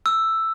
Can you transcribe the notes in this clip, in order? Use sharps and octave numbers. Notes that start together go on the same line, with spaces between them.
E6